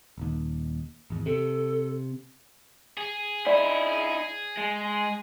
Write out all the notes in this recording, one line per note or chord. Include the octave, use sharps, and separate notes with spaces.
D#1 D#2
G#1 E2
C3 A4
G#4
D#4 E4 D5
G#3